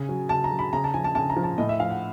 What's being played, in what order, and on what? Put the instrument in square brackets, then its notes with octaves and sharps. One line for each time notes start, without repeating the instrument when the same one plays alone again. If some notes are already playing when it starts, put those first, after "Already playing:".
Already playing: [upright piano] C#3 G#5
F#3
C#3 A5
A#5
F#3
B5
C#3 A#5
A5
F3 G#5
A5
C#3 A5
A#5
F3
A5
A2 D#5
E5
F3 F5
F#5